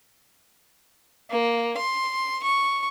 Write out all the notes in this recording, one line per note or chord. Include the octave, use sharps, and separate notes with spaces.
A#3
C6
C#6